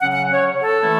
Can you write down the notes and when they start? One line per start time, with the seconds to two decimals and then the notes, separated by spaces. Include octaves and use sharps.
0.01 C#3 F#3 C#4 F#5
0.12 F#5
0.32 C#5
0.62 A4
0.82 E3 A3 C#4 E4